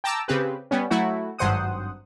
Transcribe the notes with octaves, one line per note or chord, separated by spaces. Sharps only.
G5 A5 A#5 D6 E6
C#3 C4 G4 B4
G3 B3 C#4
F#3 A3 E4 F#4
G#1 G2 F#3 C5 F#5 D#6